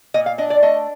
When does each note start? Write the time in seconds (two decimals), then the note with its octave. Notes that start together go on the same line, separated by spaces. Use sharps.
0.14 A#2 D#5
0.26 F5
0.38 D4 D#5
0.50 D5
0.63 A3 D#5